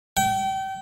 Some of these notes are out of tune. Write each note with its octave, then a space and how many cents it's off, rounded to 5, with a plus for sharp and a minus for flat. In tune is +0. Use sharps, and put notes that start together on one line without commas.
G5 -30